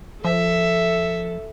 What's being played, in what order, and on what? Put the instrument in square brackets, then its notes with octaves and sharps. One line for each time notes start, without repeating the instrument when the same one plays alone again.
[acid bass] F3 [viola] A4 [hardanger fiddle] E5